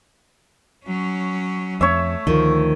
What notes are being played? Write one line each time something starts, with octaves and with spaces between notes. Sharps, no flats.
F#3 C#4
F2 A3 C#5 E5
D2 D#3 F3